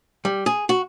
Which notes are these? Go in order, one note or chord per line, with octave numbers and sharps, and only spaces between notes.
G3
G#4
F#4